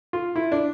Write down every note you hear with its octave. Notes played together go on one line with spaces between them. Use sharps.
F4
E4
D4